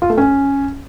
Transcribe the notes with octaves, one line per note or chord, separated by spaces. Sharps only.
F4
A3
C#4